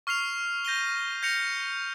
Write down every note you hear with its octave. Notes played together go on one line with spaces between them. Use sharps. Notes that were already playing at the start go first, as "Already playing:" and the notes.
C#6 F6 C7 F7
G6 A#6 D#7 G7
G6 A#6 C#7 F7